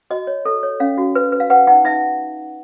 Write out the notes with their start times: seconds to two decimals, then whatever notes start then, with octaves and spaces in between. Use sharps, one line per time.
0.10 F#4 D#5
0.27 C#5
0.45 A4
0.63 C#5
0.80 C#4 F5
0.98 F#4
1.15 B4
1.32 B4
1.40 F5
1.50 B4 F#5
1.67 D#4 F#5
1.85 D#4 E5